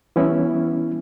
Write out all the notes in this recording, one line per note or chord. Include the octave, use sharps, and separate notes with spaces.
E3 G3 B3 C#4 E4